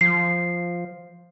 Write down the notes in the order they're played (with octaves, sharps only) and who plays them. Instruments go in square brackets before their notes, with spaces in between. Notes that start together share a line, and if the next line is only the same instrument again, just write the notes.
[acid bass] F3 [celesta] C7